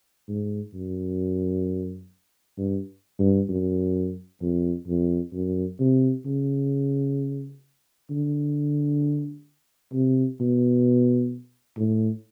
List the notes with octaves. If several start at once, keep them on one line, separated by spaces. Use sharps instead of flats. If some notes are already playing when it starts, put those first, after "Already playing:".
G#2
F#2
G2
G2
F#2
F2
F2
F#2
C3
C#3
D3
C3
B2
A2